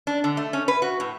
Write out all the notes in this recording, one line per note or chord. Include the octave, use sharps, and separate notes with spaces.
D4
D3
A3
C#4
B4
F#4
A2